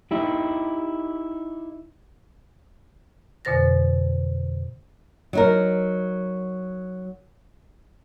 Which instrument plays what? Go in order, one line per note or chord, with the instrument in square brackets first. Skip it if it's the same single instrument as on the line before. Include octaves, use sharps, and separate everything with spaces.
[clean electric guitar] D#4 E4 G4
[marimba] F2 B2 D3 C5 A6 A#6
[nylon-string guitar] F#3 D#4 A#4